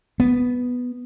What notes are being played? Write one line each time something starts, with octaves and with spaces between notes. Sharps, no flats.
B3